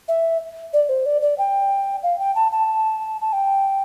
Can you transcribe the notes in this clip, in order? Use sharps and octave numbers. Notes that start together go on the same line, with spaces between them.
E5
D5
C5
D5
D5
G5
F5
G5
A5
A5
A5
G5